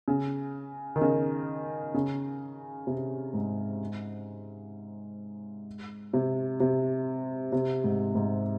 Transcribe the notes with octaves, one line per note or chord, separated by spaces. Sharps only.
C#3
D#3
C#3
C#3
C3
G#2
C3
C3
C3
G#2
G#2